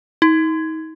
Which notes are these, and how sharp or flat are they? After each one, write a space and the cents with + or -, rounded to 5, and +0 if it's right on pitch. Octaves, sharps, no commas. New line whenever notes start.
D#4 +40